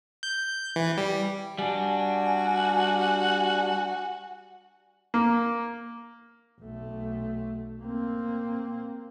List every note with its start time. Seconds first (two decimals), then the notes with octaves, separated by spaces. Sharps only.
0.23 G6
0.76 E3
0.98 G3
1.58 G3 D4 F#4 G#5
5.14 A#3
6.60 B1 A3
7.82 A#3 C4